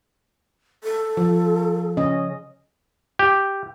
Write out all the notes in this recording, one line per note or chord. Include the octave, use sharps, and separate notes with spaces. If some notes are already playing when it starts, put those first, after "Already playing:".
A4
F3
C#3 C#4 D#5
G4